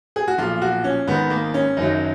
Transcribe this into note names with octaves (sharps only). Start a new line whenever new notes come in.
G#4
F#4
B1 A#2 F3 F4
F#4
C#4
G#1 G#2 D#3 B3
A#3
C#4
F#1 F#2 D#3 F#3 D#4